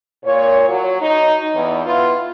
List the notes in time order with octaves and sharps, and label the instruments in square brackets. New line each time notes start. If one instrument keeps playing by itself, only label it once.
[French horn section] A#2 C#5
F#3
D#4
E2
B3 E4 F4